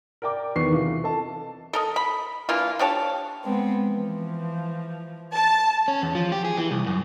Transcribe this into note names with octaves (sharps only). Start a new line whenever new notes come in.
A#4 D5 G5 A#5 D6
E2 D#3 B4 C#6 C7
C2 E3 F4
A4 D#5 A5
A4 A#4 D#5
B5
E3 A#3 D4 F4
D4 G4 C#5 A5
G#3 B3 C4
E3 F3
A5
C#4
E2
F3
G4
G#4
E3
C2
F#2